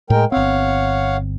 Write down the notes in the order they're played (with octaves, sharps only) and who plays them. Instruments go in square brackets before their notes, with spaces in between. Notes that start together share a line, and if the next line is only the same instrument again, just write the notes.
[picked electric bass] A2 [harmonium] G#3 A#4 G5
[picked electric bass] G1 C4 [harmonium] C#5 F5 F#5